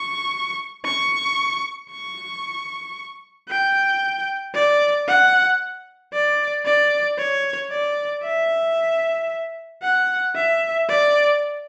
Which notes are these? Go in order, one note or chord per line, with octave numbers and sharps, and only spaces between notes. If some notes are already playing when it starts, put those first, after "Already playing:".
Already playing: C#6
C#6
C#6
G5
D5
F#5
D5
D5
C#5
D5
E5
F#5
E5
D5